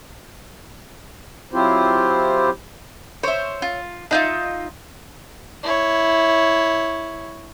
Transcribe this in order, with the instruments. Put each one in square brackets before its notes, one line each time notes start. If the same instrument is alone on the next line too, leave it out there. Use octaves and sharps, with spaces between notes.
[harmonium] F#3 C4 E4 F4 G4 C5
[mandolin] C5 [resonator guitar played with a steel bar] C#5 E5
[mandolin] F4
[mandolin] D4 D#4 F4 [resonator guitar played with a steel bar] D#5 E5
[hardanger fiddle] E4 C#5